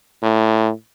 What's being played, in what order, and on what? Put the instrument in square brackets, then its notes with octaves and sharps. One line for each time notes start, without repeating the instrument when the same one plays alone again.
[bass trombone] A2